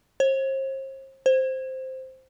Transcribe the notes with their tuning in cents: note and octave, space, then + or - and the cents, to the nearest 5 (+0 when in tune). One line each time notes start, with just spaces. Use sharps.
C5 +40
C5 +0